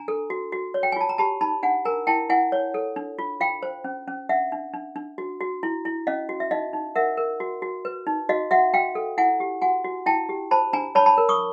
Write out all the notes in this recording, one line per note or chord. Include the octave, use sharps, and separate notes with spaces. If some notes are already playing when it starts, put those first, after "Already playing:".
Already playing: D4 G#5 A#5
A4
F#4
F#4
C#5
G5
G#5
F4 A5
A#5
G4 A5 B5
D#4 A5 B5
D4 F#5 G#5
A#4 G#5 A#5
E4 G5 A5
E4 F#5 G#5
C#5
A4
D4
F4
F4 F5 G5
C5
C#4
C#4
D4 E5 F#5
D4
D4
D4
F#4
F#4
E4
E4
C#4 D#5 F5
F#4
E5
D#4 D#5 F5
D#4
A#4 E5 F#5
A#4
F#4
F#4
B4
D#4
F#4 D#5 F5
F#4 E5 F#5
F#4 F5 G5
A4
E4 F#5 G#5
G4
F#4 F#5 G#5
F#4
E4 G5 A5
G4
C5 A5 B5
D4 G#5 A#5
C#5 A5 B5
A5 B5
A#4
C#6 D#6